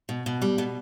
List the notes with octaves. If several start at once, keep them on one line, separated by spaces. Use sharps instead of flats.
B2
B2
G3
B2 B3